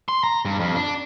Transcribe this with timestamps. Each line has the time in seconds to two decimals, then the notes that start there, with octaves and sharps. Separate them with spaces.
0.09 C6
0.24 A#5
0.45 G2
0.60 F2
0.76 D4